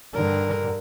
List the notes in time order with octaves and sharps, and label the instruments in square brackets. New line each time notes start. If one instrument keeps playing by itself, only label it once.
[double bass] G2 D3 [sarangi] A#4